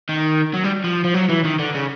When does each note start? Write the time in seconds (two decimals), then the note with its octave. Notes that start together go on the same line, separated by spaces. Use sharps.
0.09 D#3
0.54 F#3
0.64 G3
0.84 F3
1.04 F3
1.14 F#3
1.29 E3
1.44 D#3
1.59 D3
1.75 C#3